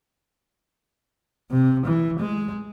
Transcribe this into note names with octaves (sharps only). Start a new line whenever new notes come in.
C3
E3
G#3